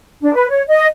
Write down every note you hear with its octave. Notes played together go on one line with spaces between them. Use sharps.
D4
B4
C#5
D#5